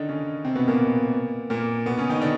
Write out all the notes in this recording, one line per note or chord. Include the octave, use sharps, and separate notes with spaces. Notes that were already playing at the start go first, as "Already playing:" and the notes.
Already playing: D3 D#3 D4 D#4
C#3 C#4
C3 C4
B2 B3
A#2 A#3
A#2 A#3
B2 B3
C#3 C#4
D#3 D#4
D3 D4